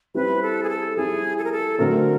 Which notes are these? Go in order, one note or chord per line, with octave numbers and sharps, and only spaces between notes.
G3 C4 E4 B4
A4
G#4
A4
G3 C4 E4 G#4
A4
A#4
A4
D3 F#3 A3 C4 A#4